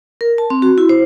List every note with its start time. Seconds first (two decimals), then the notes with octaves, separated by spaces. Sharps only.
0.21 A#4
0.38 A5
0.50 C4
0.62 F#4
0.78 E4
0.89 C5